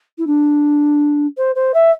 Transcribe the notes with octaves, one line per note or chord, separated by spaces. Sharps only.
E4
D4
C5
C5
E5